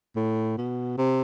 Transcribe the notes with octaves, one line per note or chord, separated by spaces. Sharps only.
A2
B2
C3